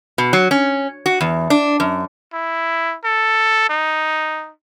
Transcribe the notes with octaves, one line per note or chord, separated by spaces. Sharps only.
B2
F#3
C#4
F#4
E2
D4
F#2
E4
A4
D#4